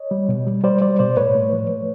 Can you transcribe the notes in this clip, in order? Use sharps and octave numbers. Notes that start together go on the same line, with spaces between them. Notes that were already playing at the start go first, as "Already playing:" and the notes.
Already playing: C#5 D#5
G3
B2
G3
G3 C5 D5
G3 C5 D5
B2 C5 D5
A2 B4 C#5
A3
F3
A3